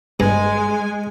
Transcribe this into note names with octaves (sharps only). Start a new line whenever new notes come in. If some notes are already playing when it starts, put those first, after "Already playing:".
G2 G#3 G#5